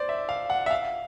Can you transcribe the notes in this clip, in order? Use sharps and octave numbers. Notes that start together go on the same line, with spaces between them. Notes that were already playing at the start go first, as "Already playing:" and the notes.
Already playing: C5 D5
E5
F5
F#5
E5
F5